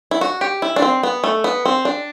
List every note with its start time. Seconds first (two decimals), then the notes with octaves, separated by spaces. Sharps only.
0.11 E4
0.21 F#4
0.41 G4
0.62 E4
0.76 D4
0.82 C4
1.03 B3
1.24 A3
1.44 B3
1.66 C4
1.85 D4